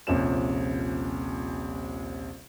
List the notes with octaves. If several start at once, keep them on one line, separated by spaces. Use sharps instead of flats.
D#1 A#1 C3 C#4 E7